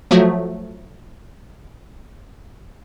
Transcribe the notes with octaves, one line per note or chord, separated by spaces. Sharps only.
F3 F#3 A3 F#4